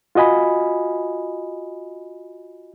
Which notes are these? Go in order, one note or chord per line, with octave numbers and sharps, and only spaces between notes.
F4 F#4 D#5 G#5 B5